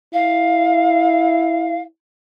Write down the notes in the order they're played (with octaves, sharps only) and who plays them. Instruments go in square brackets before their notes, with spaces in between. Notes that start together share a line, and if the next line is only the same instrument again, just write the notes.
[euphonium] E4 [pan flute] F5